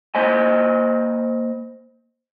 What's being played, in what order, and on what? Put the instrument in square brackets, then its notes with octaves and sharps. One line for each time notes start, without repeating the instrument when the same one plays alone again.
[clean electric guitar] A#3 C5 D#5 G#5